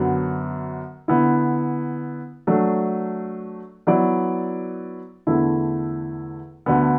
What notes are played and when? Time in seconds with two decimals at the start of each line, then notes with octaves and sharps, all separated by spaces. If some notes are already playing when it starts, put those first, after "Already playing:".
Already playing: F#2 D3 F#3 B3
1.08 D3 B3 E4
2.47 F#3 A3 D4
3.87 F#3 B3 E4 D5
5.27 E2 D3 A3 E4
6.66 D2 D3 B3